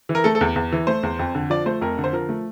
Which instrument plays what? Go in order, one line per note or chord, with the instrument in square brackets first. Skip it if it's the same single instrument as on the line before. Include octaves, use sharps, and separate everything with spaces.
[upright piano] E3
A#4
A3 A4
A4
E2
E2
E3
A3 C5
E2
F2
D3
F3 D5
A3 C5
F2 A#4
D3
C5
F3 A#4
A3